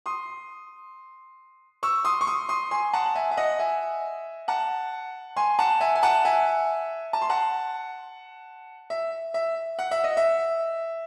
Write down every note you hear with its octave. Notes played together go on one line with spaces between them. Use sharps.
C6 D#6
C#6 E6
C6 D#6
C#6
C6 D#6
C6 D#6
G#5 C6
F#5 A5
F#5
E5 G#5
E5
D#5 F#5
E5 G#5
F#5 A5
G#5 C6
F#5 A5
E5 G#5
G#5
F#5 A5
E5 G#5
A5
C6
F#5 A5
E5
E5
F#5
E5
D#5
E5